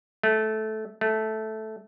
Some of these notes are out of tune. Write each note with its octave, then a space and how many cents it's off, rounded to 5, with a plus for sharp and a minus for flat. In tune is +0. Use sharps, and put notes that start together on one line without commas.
A3 -15
A3 -10